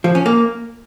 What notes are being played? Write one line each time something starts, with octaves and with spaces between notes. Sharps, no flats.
F3
C#4
A#3